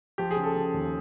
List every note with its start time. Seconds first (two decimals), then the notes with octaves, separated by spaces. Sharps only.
0.18 F3 G4
0.31 G#4
0.36 C#3
0.44 A4
0.55 C#3
0.74 D#2